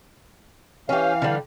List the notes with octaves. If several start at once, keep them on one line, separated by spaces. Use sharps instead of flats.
E3 C#4 G4 F5
D3 G3